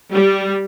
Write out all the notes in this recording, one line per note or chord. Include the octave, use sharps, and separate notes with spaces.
G3